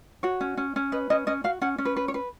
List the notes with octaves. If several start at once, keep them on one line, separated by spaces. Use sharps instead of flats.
F#4 C#5
C#4
C#4
C#4
B4 D#5
C#4 D#5
C#4 D#5
F#4 F5
C#4 F#5
C#4
B4
B4
C#5
B4